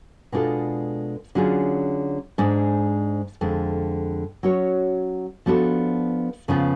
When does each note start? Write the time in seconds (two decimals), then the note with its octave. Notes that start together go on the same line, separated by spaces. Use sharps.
0.32 B2 G#3 D4 F4 A4
1.35 D3 F#3 C#4 F4 G#4
2.38 G#2 G#3 D4
3.41 F2 D3 G#3
4.43 F#3 C#4 F#4 C#5
5.46 F3 B3 D4 F#4 A4
6.48 F2 C#3 F3 B3 F4